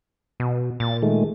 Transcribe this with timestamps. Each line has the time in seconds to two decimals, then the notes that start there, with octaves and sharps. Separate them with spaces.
0.40 B2
0.80 A#2 A6
1.02 D#3 G#3 A3